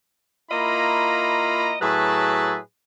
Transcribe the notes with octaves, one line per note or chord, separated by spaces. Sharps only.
A#3 E4 F4 D#5 A#5 B5
A2 F#3 G#4 B4 E5 A5